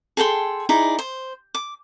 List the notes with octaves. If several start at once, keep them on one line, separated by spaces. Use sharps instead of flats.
G#4 A4 G5 C6
D#4 E4 G#4 D5
C5
D6